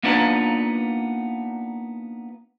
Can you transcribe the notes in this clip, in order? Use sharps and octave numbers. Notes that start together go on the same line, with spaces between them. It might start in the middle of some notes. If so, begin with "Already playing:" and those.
A#3 B3 D4 D#4 F4 B4